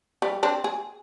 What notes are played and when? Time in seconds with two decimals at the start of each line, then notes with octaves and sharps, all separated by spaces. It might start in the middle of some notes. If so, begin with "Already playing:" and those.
0.22 G3
0.43 C4 D4
0.64 G#4